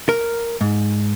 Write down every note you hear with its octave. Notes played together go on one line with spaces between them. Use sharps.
A#4
G#2